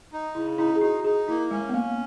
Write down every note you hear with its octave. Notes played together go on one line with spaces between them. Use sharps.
D#4
C#3 E4
D#4 E4
G#4
D#4 F#4
D#4 G#4
A#3 E4
G#3 C#4
B3
A#3 C#4